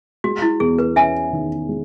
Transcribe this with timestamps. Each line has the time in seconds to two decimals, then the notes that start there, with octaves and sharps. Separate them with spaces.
0.24 G#3 F#4
0.42 E4
0.60 E2 G#4
0.79 B4
0.96 C#4 E5 G#5
1.33 D#3
1.69 G#3